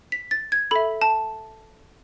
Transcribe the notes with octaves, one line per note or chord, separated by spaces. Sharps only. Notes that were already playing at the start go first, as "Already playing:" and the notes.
B6
A6
G#6
A4 E5 B5
A5